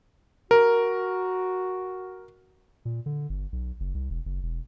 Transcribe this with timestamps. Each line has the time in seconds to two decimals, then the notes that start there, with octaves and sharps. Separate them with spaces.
0.51 F#4 A#4
2.85 A#2
3.06 D3
3.29 G1
3.52 B1
3.80 F#1
3.94 C2
4.10 E1
4.25 F#1
4.43 E1